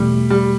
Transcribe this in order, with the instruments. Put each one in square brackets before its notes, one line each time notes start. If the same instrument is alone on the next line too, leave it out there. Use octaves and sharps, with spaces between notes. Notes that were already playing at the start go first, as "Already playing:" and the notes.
Already playing: [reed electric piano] E2 B2 A3 [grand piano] G3
[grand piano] G3